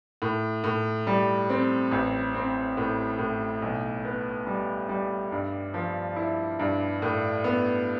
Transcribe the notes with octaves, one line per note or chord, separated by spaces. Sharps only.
A2
A2
G3
C4
A1
C4
A2
A2
B1
B3
G3
G3
G2
F3
E4
G2
A2
B3